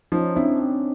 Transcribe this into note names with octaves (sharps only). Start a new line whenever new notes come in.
F3 C#4 D#4
C4 D4 E4